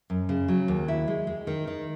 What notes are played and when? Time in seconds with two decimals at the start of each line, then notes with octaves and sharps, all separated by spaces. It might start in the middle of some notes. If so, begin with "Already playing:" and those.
0.10 F#2
0.29 C#3
0.48 F#3
0.68 D#2
0.88 E4
1.07 G#3
1.27 G#3
1.47 D#3
1.67 D#3